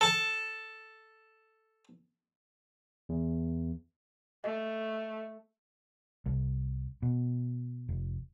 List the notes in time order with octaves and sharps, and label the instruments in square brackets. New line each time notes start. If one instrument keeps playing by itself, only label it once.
[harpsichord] A4 A5
[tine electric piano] E2
[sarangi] A3 [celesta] D#5
[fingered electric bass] C2
B2
F1